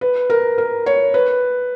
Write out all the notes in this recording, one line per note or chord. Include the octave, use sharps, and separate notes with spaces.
B4
A#4
A#4
C#5
B4